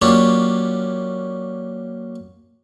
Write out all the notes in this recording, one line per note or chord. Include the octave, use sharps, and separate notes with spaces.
F#3 A#3 C#4 D4 F4 G4